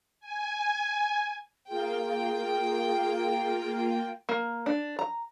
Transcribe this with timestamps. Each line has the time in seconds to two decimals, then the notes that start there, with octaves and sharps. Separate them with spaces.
0.20 G#5
1.69 A#3 F4 G#4 G5
4.29 A#3
4.66 D4
4.99 A#5